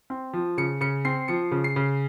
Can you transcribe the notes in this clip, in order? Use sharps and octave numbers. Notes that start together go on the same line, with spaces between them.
C4
F3
C#3 C#7
C#3 C#7
C4 C7
F3 C#7
C#3
C7
C#3